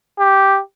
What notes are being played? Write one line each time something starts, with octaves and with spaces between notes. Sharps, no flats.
G4